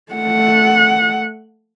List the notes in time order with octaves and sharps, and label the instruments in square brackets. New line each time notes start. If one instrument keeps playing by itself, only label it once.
[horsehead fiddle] A3 F#5